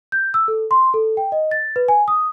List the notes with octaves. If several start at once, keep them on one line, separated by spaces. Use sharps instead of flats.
G6
E6
A4
C6
A4
G5
D#5
A6
B4
G#5
D#6